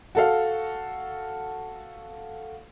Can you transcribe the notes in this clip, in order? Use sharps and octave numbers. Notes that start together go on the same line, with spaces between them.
F#4 A4 F5